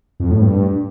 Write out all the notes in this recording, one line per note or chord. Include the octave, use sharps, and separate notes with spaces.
F2
A2
G2